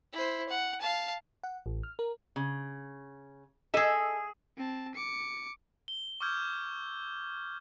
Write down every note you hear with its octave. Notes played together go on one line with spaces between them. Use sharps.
E4 C5
F#5
F5 A5
F#5
A1
F6
A#4
C#3
G#4 A4 D#5 E5 G#5
C4 A5
D6 C#7
G7
C#6 D6 E6 F6 G6 G#6